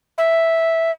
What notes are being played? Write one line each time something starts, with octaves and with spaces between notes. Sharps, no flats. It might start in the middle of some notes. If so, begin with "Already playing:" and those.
E5